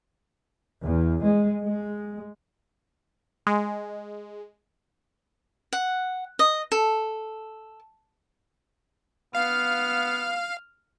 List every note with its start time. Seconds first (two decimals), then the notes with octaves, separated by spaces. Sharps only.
0.85 E2
1.25 G#3
1.63 G#3
3.47 G#3
5.73 F#5
6.39 D#5
6.72 A4
9.35 B3 F5 F6